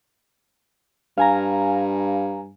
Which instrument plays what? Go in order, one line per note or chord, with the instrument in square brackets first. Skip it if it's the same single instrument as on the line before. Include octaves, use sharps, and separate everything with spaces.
[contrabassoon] G2 [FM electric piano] F5 G#5 A#5